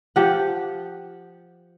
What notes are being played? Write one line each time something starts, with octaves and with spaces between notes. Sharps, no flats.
F3 G4 F#5